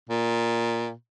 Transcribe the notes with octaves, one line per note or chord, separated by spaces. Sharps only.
A#2